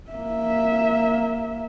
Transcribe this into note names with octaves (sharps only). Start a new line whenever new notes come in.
A#3 E5